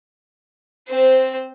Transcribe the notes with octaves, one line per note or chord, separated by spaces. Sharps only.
C4 C5